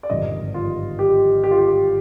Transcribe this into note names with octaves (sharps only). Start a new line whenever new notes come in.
D5
G#1 G2 D3 F3 D#5
F4
G4
G4
F4
G4